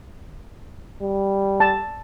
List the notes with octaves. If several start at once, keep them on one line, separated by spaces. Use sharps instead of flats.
G3
A5